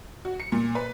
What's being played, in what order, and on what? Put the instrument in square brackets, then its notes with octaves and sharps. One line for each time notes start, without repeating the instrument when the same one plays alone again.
[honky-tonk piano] F#4
C#7
A#2
B4